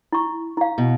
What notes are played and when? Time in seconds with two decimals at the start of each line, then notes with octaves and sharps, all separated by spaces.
0.13 E4 C#6
0.57 E4 F5
0.78 B2